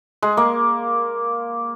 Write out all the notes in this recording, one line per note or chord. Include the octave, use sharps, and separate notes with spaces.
G#3
A#3